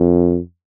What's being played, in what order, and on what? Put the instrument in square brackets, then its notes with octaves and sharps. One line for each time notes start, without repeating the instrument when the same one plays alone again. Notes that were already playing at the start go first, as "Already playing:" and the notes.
Already playing: [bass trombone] F2